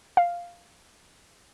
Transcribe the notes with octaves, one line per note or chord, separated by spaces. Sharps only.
F5